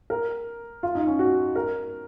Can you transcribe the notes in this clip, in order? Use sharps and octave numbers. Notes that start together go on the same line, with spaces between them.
A#4
F4
D#4
C#4
F#4
A#4